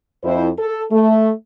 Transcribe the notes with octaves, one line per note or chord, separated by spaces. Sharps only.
F2 E4 C5
A4
A3